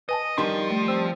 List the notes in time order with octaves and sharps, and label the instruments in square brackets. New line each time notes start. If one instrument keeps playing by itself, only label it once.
[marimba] B4 G#5 A5 [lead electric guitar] D#5
[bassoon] D#3 [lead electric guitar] F3 [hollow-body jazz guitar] G3 D4 C6
[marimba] A3
[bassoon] C4 [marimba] E6